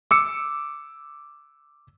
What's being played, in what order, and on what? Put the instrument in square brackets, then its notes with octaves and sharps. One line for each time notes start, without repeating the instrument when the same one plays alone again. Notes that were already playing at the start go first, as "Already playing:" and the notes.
[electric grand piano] D6 E6 C#7